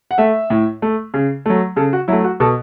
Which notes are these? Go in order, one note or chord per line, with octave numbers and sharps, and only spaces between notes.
F#5
A3 E5
A2
A3
C#3
F#3 A3
C#3 A4
F#4
F#3 A3 E4
F#4
B2 A4